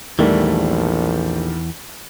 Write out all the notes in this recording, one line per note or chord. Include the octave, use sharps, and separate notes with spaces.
A#1 E2 D#3 E3 G3 A3